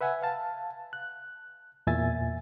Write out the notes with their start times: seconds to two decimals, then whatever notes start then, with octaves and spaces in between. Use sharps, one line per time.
0.01 B4 E5 F#5 G#5
0.23 F5 A5
0.93 F#6
1.87 E2 A#2 E5 G#5 A6